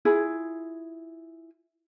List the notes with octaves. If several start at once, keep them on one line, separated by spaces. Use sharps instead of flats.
E4 F4 G#4